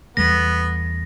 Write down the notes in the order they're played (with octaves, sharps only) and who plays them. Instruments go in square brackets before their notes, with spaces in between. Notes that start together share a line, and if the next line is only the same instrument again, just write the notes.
[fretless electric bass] E2 G3 A3 [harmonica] B3 [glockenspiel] A#6